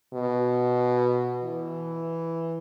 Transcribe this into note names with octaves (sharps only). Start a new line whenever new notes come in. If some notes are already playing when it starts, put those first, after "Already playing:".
B2
E3